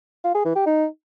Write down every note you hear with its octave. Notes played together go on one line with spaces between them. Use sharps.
F4
G#4
E3
G4
D#4